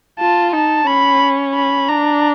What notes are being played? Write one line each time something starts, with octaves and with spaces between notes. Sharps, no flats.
F4 A5
D#4 A5
C#4 B5
B5
D4 A#5